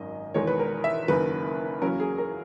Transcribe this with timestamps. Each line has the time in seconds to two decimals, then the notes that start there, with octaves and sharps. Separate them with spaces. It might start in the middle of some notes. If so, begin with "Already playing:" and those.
Already playing: G#1 F#2 D#3 D#5
0.34 E1 E2 D#3 G#3 C#5
0.47 B4
0.59 A#4
0.84 E5
1.08 F#1 F#2 D#3 B4
1.81 E2 C#3 F#3 A#3 C#4 A#4
2.00 G#4
2.18 A#4